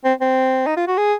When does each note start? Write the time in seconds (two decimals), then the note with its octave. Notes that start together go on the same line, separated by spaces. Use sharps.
0.05 C4
0.21 C4
0.67 D#4
0.77 F4
0.87 F#4
0.97 G#4